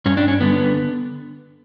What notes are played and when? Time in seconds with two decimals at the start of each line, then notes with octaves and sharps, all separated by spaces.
0.06 G2 C#4
0.17 D4
0.28 C#4
0.41 D3 B3